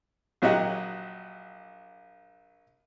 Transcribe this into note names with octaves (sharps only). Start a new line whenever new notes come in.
A#1 F#3 F#4 G4 D#5 F#5